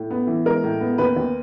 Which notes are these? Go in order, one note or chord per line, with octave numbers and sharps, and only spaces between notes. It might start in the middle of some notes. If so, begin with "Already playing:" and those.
Already playing: A2
B3
E3
G#3 A#4
A2
B3
D#2 B4
D#2